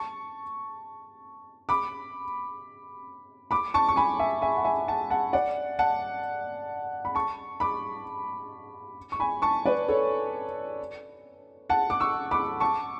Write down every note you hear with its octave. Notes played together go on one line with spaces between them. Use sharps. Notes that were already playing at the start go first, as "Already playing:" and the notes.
Already playing: A5 C#6
B5 D6
B5 D6
A5 C#6
C#6
G#5 B5
E5 G#5
E5 G#5
F#5
E5 G#5
F#5 A5
F#5 A5
D5 F#5
F#5 A5
B5
A5 C#6
B5 D6
C#6
G#5 B5
A5 C#6
B4 D5
A4 C#5
F#5 A5
D6
C#6 E6
B5 D6
A5 C#6